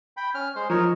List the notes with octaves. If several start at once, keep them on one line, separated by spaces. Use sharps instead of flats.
G5 B5
C#4 F6
G#3 C5
F3 D#4 A#4 C#5